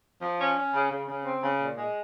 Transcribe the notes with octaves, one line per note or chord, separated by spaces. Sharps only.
F3
C#4
C#4
C#3
C#3
C#3
C4
C#3
A#2
G#3